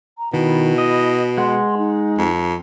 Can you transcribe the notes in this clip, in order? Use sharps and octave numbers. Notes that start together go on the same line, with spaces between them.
A#5
B2 D#3 E4
D#5
G#3 F#5 C6
D#4
F2